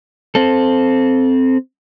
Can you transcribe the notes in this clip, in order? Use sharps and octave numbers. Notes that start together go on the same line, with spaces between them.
C4 A4